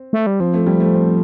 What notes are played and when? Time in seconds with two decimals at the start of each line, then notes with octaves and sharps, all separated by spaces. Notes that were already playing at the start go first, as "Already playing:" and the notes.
Already playing: C4
0.13 A3
0.27 G3
0.40 F3 C4
0.54 A3
0.66 G3
0.80 A3
0.94 C4